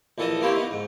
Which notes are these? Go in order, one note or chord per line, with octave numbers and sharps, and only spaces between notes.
A#1 E3 A4 D#5
A#3 C4 E4 G4 C#5
B3 D#4
G#2